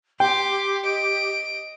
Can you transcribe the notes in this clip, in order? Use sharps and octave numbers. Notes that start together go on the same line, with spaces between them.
G4 G5 C6 D6
D#5 D7